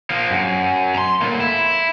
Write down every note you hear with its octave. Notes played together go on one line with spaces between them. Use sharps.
F3 A#3
F#2
A#5 C6
A2 A#3
E4